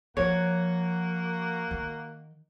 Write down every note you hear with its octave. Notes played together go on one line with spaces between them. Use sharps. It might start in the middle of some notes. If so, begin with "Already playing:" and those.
F3 A#3 F#4 C#5 F#5
D#3